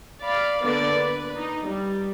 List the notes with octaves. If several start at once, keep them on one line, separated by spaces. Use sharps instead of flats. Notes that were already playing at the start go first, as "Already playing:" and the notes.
D5 F5 B5
D3 A#3 B3 B4 D5
B4
D#4
G3